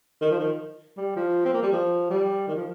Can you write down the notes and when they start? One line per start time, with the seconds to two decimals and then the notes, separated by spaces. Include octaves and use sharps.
0.21 D#3
0.31 F3
0.40 D#3
0.96 G3
1.16 F3
1.45 C4
1.54 A#3
1.62 G3
1.72 F3
2.10 G3
2.48 D#3
2.55 F3